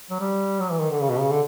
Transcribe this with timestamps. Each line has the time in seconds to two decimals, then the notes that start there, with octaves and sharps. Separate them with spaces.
0.10 F#3
0.20 G3
0.60 F#3
0.71 E3
0.80 D#3
0.90 D3
1.00 C#3
1.10 B2
1.20 C#3
1.30 D3